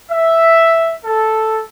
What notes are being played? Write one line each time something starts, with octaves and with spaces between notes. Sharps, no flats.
E5
A4